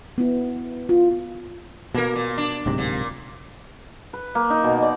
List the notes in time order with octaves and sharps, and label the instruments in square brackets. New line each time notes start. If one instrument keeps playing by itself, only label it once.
[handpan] B3 E4
F4
[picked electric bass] B2 [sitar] A#3 A#4
[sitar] A#2
D4
[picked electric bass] D1 G#2 C3
[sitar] A#2
[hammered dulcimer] B4
A#3
D#4
B2
D5